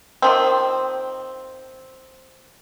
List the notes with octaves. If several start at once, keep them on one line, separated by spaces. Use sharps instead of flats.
D#3 F3 C4